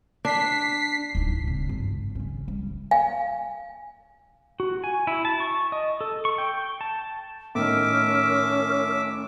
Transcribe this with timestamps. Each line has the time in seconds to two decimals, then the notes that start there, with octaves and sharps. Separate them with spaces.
0.25 D4 B6 C7
1.15 D1 D#4
1.44 C#3 C4
1.69 G#1 G2
2.15 C#3 C#4
2.48 G3
2.91 F5 G#5
4.60 F#4
4.84 G#5
5.07 E4
5.25 A5
5.40 C#6
5.72 D#5
6.01 A4
6.25 C#6
6.38 G5
6.81 A5
7.55 A2 D#3 C#4 A#4 E5 D6